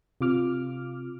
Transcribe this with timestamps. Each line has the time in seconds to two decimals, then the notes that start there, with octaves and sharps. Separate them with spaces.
0.21 C3 F4 D6 F6